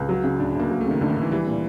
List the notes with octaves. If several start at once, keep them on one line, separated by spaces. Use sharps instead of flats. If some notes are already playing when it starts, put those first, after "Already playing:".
Already playing: C#2
F#3
C#3
D2 D4
D2 A#3
F#3 A#3
A3
C#3
D#3
D2 D3
D#3
D2 E3
E3 G3
A#2